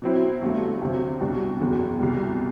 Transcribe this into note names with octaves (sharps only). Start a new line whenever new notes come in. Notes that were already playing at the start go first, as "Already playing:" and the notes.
B2 F#3 C4 E4
G1 G2 F#3 A3
D2 C3 F#3 C4
C2 B2 G3 D4 F#4
F#1 E2 B2
C2 B2 G3